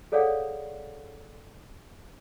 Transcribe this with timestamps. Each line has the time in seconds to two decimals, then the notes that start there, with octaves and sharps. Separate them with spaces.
0.12 G#4 A4 C#5 D5 F5 F#5